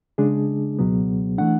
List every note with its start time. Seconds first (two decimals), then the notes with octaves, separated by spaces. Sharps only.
0.18 C#3 G#3 D4 G#4
0.79 C#2 B2 F#3 B3
1.38 E3 A3 D4 F#5